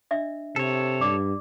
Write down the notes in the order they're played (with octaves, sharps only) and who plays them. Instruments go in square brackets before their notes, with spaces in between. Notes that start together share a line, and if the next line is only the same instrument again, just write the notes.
[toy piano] D4 D#5 E5
[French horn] C3 [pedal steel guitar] A4 C#5
[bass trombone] G2 [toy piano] D5 D6